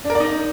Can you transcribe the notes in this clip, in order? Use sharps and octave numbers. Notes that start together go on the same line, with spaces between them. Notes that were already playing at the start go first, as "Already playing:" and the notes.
D4
A#4
D5
D#4